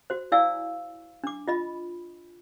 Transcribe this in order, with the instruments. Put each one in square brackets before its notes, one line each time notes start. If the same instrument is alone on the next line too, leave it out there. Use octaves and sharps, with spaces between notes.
[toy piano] F#4 C5
E4 D5 F5 G#5 E6
D4 D6
F4 D#5 B5